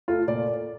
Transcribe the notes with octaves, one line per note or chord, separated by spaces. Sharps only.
A3 F4
A#2 D5